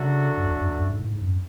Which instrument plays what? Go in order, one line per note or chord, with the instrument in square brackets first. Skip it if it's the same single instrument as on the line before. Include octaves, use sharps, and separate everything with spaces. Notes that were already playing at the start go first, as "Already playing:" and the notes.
Already playing: [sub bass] C#3 [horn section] F#3 A3 D4 F#4 A4
[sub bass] F#2
E2
F#2
E2
F#2
G#2
A2
G#2
F#2